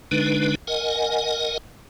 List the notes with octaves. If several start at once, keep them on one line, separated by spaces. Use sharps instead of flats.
D3 G#3 D4 D#4 B4
A#4 D#5 F#5 G#5